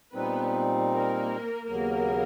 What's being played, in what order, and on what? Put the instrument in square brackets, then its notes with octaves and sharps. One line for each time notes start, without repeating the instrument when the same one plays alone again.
[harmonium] A#2 G3 C4 D#4 [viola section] B3 B4
[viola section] A#3 A#4
[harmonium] D#2 C#3 F#3 B3 [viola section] A#3 A#4